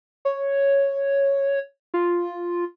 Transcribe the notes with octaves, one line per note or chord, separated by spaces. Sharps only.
C#5
F4